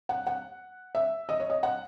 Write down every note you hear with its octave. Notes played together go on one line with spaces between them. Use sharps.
F#5
F#5
E5
D#5
C#5
D#5
F#5